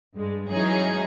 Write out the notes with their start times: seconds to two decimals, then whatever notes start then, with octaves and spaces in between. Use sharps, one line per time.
0.15 G2 G#3
0.48 E3 F#3 G#3 C#4 D#4 G#4